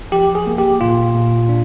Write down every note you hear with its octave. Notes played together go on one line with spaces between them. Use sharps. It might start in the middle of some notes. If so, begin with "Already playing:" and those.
F3 G4
G#4
A#3
G4
A#2 F4
A#2
D4